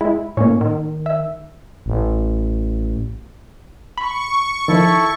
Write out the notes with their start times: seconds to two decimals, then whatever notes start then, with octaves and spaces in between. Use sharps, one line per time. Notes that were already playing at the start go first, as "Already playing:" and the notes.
0.01 G#3 E4
0.37 A2 A#3 C#4 C#5
0.61 D#3
1.06 E5
1.86 A1
3.98 B5 C#6
4.68 D#3 F3 E4 A4